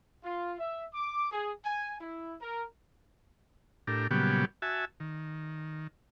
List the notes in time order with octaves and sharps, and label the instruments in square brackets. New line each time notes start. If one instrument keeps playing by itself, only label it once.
[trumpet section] F4
E5
D6
G#4
G#5
E4
A#4
[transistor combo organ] A2 D4 G4 A#4
A#2 C#3 F#3 G3 B3 G4
F#4 E5 G#5 A5
D#3